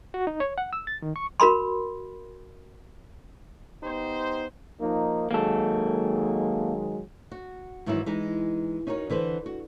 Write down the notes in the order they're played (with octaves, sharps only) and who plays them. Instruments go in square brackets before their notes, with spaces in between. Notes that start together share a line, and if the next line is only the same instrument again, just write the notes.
[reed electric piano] F#4
D#4
C#5
F#5
E6
A6
D#3
C#6
[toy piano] F#4 A#4 B5 C6
[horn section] B3 D#4 G4 C5
[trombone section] F3 A#3 D#4
[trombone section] D#3 F#3 G#3 [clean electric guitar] A#3 A4
[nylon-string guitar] F#4
G#2 D#3 E3 F#3 D#4 E4
E3 G#3 D#4
C#4 D#4 F#4 A#4 C#5
D3 E3 B4 C5
F#4